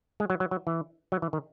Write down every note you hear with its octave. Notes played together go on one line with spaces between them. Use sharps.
G#3
F#3
F#3
F#3
E3
F#3
E3
D#3